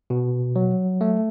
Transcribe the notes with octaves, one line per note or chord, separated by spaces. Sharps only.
B2
F#3
A3